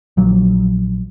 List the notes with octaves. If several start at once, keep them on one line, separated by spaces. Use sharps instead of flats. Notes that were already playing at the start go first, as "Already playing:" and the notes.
A#1 F3 F#3